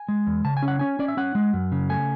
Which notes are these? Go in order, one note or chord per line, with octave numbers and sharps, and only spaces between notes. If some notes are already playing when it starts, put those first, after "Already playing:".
Already playing: G#5
G#3
E2
C#3 A5
G#5
C#4
F#5
C#4 G#5
C#4 D5
E5
C#4 F#5
G#3
F#2
C#3
A3 G#5